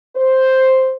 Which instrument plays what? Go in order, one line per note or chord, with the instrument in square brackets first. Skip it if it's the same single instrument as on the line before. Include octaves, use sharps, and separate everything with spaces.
[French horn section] C5